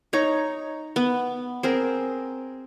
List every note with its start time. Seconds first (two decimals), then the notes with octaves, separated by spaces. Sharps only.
0.13 D#4 C#5 A#5
0.96 B3
1.63 C4 G#4 A#4